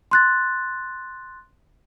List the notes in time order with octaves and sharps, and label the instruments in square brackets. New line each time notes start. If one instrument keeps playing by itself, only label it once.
[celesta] C6 F#6 A6